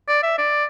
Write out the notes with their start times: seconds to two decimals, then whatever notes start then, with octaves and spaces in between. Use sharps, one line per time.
0.08 D5
0.23 E5
0.38 D5